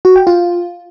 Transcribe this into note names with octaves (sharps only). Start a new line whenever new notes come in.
F#4
G5
F4